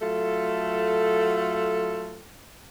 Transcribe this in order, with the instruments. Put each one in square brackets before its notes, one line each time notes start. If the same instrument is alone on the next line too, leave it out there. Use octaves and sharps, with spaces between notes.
[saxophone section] F#3 A3 F4 A4